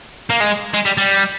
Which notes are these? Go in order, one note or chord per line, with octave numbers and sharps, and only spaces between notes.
A#3
G#3
G#3
G3
G3